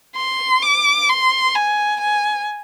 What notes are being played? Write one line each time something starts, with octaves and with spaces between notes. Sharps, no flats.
C6
D6
C6
G#5
G#5